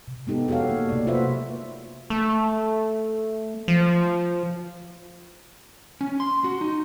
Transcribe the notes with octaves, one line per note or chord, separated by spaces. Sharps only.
C3
G#3 B3 D#4 G4 A4
F#4 G4 A4 C#5 F5
A#3
C3 A3 A#3 D5
A#3 F4 F#4 B4 C5 E5
A3
F3
C#4
C6
F#4
D#4